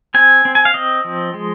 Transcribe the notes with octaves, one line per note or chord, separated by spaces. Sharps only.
C4 G#5
C4
G#5
F5
C4 D#5
F3
G#3